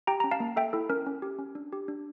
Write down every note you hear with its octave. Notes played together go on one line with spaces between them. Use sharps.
G4 G5 A#5
C#4 A#5
F5 A5
A#3
A4 E5 G5
E4 A4
C#4 A#4
C#4
G4
C#4
D4
G4
D4